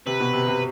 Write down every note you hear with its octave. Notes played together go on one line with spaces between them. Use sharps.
C3 B4
B2
C3
C3